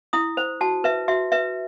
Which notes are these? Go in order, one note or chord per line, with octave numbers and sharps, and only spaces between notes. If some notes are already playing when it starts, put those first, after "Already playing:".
E4 D#6
C5
F#4 A5
B4 E5
F#4 E5
B4 E5